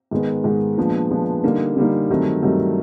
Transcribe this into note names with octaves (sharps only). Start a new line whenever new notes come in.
G#2 D#3 G#3 B3
G#2 D#3 G#3 B3
A#2 F3 G#3 B3 D4
A#2 F3 G#3 B3 D4
D3 G3 A#3 D#4
D3 G3 A#3 D#4
G2 D#3 F#3 A3 C4
G2 D#3 F#3 A3 C4